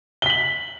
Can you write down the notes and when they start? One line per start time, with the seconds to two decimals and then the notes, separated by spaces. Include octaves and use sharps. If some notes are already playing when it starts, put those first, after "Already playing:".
0.22 G7
0.26 B6
0.30 F#7